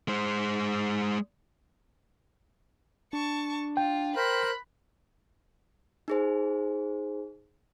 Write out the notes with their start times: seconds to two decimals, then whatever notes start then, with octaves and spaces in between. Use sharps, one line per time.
0.08 G#3 C5
3.13 D4 A5 C#6
3.77 F4 G5
4.16 A#4 C5 B5 F#6
6.08 D#4 G#4 C5